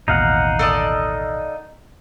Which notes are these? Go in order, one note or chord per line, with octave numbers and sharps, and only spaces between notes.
A1 D#2 B2 D#4 F5 F#5
A4 D5 D#5